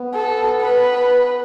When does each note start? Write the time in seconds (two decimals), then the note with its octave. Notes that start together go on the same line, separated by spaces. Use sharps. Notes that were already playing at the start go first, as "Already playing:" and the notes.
Already playing: B3
0.14 A4
0.62 B4